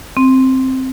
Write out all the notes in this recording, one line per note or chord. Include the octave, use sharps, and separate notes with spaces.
C4